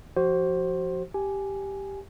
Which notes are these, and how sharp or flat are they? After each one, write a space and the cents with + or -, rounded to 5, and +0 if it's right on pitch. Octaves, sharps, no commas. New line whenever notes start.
F3 +0 F#4 +35 C5 +15
G4 +0 G#5 +10